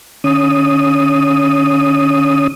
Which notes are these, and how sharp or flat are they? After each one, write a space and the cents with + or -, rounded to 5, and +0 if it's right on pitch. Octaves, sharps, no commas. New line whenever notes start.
D#3 -40 C#4 +10 D#6 +0